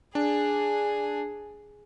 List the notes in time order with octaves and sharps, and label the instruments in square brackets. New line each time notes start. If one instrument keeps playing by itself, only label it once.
[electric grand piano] D4 [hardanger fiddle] G#4